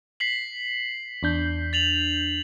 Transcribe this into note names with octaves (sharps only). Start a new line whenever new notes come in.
B6 C7 F#7
E2 D4 G6
A6 F7 F#7